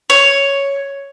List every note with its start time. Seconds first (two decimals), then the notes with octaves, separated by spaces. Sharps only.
0.10 C#5